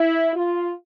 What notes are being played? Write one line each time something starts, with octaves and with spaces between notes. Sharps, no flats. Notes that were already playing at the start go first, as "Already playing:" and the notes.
Already playing: E4
F4